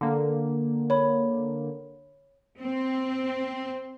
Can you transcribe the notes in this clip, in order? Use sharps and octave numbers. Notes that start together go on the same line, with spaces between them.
D3 A#3
C#5 B5
C4